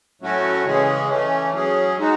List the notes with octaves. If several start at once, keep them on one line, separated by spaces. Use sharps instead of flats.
A2 F#3 A3 C#4 F#4
C#3 E3 G#3 C#4 G#4
E3 A3 C#4
F#3 C#4 G#4
G#3 D#4 F#4